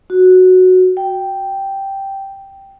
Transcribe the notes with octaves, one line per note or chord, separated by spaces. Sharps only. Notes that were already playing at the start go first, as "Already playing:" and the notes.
F#4
G5